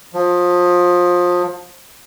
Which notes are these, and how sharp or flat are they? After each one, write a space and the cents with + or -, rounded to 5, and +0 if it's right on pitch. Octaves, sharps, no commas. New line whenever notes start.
F3 +25